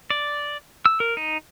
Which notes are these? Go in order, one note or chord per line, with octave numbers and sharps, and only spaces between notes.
D5
E6
A#4
D#4